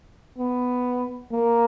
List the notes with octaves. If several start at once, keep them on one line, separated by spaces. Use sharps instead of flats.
B3
A#3